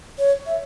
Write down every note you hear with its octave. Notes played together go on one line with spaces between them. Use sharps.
C#5
E5